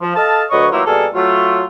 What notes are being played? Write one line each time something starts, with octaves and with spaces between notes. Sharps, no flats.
F3
A4 D#5 F5 A5
D2 F#3 B4 C#5 D#5 C#6
E3 F#3 A3 A#3 E4 F4
B2 G3 A#3 G#4 A4
F#3 A3 F4